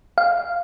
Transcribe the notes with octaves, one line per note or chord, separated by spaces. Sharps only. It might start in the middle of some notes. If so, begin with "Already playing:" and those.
F5